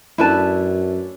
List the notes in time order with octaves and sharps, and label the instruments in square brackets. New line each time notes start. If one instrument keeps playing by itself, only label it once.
[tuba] F#2 [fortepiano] A3 C#4 D4 [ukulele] E4 B4 A5